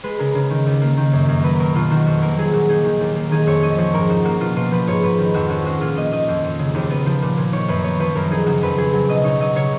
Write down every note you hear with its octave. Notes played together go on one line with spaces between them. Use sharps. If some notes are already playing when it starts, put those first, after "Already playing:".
G#3 B4
C#3 A#4
C#3
D#3
D#2
A#3
D#3
F#2
F#2
F#3 B4
B2 A#4
B2 F4
D#3 F#4
F2 F#4
A#3 A#4
F#3 G#4
A#2 F#4
D#4 G#4
D#3
D#2
A#3
D#3 G#4
F2 C#5
C#4 D#5
F3 C#5
G#2 A#4
D#4 F#4
A#3 F#4
B2 F4
B2 F4
F3 B4
G#2 C#5
G#2 B4
D#3
F2 F#4
C#4 F#4
G#3 F#4
A#2 F4
A#2 D#5
D#3 D#5
F2
F2
C#3
D#2
B3
F3
A#2
A#2
D#3 C#5
F#2 B4
B3 C#5
F3 B4
F#2 A#4
D#4 G#4
C#3 F#4
F2 B4
F2 G#4
F#3
B2 D#5
D#4 C#5
F#3 D#5
C#3 C#5